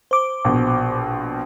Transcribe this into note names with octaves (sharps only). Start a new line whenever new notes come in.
C5 D6
A#1 B2